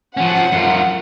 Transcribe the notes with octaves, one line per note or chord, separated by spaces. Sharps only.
F3 C#4 F#5
F#2 F4